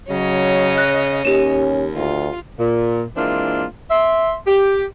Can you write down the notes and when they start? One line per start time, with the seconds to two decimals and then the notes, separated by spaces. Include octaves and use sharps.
0.10 C#3 F#3 C#5 D#5
0.78 F#6 A#6
1.25 D#2 C#4 G4 E7
1.95 D2 F4
2.59 A#2
3.16 E3 G#3 A#3 C4 D4 F4
3.91 E5 C6
4.47 G4